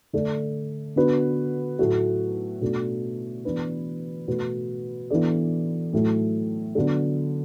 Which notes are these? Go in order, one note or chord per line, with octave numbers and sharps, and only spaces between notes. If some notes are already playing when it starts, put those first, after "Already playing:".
D3 A3 D4 A4 D5
D3 B3 D4 F#4 B4
A2 F#3 A3 F#4
B2 A3 D4 F#4
E3 B3 D4 B4
B2 A3 F#4 B4
E3 B3 D4 A4 D5
A2 F#3 A3
D3 F#3 B3 D4 A4